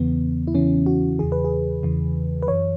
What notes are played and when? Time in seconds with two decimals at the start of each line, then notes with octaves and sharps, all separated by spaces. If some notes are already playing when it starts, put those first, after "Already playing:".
Already playing: E2 C#3 E3 B3
0.48 E4
0.54 E2 C#3 E3 C#4
0.86 F#4
1.19 E2 C#3 E3 G#4
1.32 B4
1.44 G#4
1.83 E2 C#3 E3
2.43 B4
2.47 F#2 E3 C#5